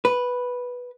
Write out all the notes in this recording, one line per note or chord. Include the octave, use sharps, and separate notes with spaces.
B4